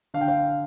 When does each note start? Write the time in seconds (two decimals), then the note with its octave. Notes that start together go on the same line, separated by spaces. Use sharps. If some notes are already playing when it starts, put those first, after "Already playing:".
0.14 D3 F5
0.21 G5
0.28 F5